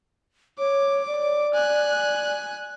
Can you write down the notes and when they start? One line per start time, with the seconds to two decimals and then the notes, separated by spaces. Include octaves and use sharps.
0.59 C#5 D6
1.07 D5
1.54 G#5 F#6